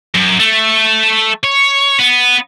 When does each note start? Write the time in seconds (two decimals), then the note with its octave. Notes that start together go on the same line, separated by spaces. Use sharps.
0.15 F#2
0.40 A3
1.44 C#5
2.00 B3